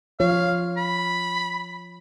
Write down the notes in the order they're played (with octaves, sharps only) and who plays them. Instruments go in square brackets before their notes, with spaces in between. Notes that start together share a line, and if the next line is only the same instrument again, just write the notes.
[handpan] F3 F4 C#5 [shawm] F5
[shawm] B5